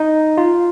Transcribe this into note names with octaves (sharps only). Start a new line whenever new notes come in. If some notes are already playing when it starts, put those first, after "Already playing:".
Already playing: D#4
F4